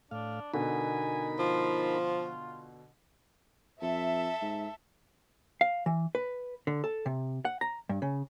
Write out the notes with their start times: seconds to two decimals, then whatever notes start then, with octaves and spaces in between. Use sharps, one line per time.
0.11 A2 D4 F5
0.54 B2 D3 B3 D#4 A#4 G#5 B5
1.39 F3 F4
3.82 F2 A4 E5
4.42 G#2
5.61 F5
5.86 E3
6.15 B4
6.67 D3
6.84 A4
7.06 C3
7.45 F#5
7.61 A#5
7.89 G2
8.02 C#3